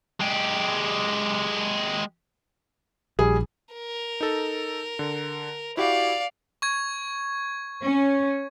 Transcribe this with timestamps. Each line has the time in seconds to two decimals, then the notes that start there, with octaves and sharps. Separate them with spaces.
0.20 G#3 G4
3.19 A#1 G3 G#4
3.73 A#4
4.21 D#4 A4
4.99 D3
5.77 E4 F#4 G4 D5 F5
6.62 C#6 G#6
7.82 C#4